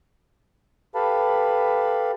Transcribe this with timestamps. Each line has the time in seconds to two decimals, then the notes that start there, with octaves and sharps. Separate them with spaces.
0.95 G4 A4 B4 F5 A5 B5